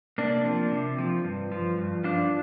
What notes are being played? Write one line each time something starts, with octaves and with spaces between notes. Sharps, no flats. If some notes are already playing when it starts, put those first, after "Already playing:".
C3 A#3 D4
F3
C3
F3
G2
F3
G2
F3 D4 F4